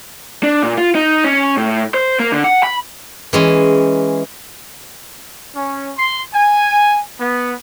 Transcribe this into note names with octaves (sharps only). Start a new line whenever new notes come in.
D4
A#2
F4
D#4
C#4
A2
C5
A#3
D3
F#5
B5
E3 G#3 C#4
C#4
C6
G#5
B3